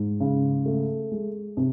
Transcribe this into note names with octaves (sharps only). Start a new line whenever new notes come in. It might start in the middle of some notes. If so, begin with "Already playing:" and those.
Already playing: G#2
C#3
A3
G#3
C3